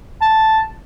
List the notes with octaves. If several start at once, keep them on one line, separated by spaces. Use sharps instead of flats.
A5